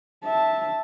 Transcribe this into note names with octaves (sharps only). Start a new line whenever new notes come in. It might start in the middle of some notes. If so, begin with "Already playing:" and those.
E5 A5